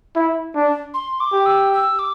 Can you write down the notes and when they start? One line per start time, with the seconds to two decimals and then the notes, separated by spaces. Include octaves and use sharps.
0.16 E4
0.55 D4
0.94 C6
1.20 D6
1.33 G4
1.46 E6
1.73 E6
1.99 D6